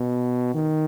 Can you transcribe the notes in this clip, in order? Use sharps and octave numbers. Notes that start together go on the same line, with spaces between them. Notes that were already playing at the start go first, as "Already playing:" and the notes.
Already playing: B2
D#3